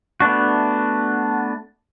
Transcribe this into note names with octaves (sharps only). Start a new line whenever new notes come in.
A3 B3 D4 F#4